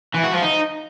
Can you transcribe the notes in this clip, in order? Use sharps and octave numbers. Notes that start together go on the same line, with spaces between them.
E3
F#4
F3
D#4